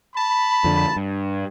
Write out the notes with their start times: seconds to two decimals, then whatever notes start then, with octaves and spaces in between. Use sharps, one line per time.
0.16 A5 B5
0.64 F2 D3
0.96 G2